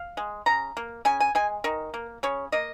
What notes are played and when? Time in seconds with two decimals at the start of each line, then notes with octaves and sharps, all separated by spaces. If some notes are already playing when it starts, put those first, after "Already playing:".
Already playing: F5
0.17 G#3
0.46 C#3 A#5
0.77 A#3
1.05 C#3 G#5
1.20 G#5
1.35 G#3 G#5
1.64 D#3 A#4
1.94 A#3
2.23 C#3 C#5
2.52 A#3 D#5